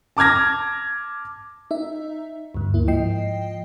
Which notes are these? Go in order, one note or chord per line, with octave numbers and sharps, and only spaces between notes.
A5 D6 F6 G#6 A#6
D#4 E5
D2 G2
A#3 E4
G#2 F3 D#5 G5 C7